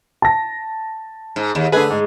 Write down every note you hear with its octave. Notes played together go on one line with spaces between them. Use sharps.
A5 A#6
G#2
D#2
D3 A3 G#4 B4
G#2